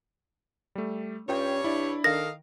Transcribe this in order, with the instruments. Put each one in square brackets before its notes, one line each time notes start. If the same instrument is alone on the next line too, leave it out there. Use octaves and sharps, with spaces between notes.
[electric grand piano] G3 A3
[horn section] G2 C#5 [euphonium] C#4 [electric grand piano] F4 G5
[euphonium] D4 [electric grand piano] E4 D5
[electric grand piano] D#3 A#4 [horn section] A4 D#5 F5 [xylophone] A#6